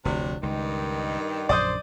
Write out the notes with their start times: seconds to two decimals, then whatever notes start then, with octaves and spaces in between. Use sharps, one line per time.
0.05 F1 D2 C3 F#3 D4
0.43 C#2 G2 D#3
1.49 A#1 F#2 D3 C5 D5 D#6 G6